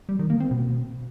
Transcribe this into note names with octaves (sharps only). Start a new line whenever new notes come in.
G3
D#3
A#3
C4
B2